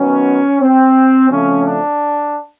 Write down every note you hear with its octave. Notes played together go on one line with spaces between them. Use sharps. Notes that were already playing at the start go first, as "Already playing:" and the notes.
Already playing: D#3 F#3 B3 C#4
C4
C#3 F3 A3 C4 C#4
D4